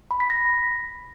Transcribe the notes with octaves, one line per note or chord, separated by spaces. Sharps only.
B5
B6
A#6